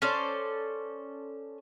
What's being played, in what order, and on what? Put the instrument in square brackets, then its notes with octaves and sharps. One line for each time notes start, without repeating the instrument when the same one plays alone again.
[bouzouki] C#4 A4 C5 D5